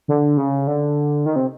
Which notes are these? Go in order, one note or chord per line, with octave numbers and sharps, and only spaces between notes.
D3
C#3
D3
D#3
C3